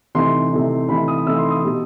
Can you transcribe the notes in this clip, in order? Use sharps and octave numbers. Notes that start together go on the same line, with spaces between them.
C3 E3 A3 D#4 C6
C3 E3 A3 D#4
C3 E3 A3 D#4 B5
D#6
C3 E3 A3 D#4 E6
C6
D#6
B2 G3 D#4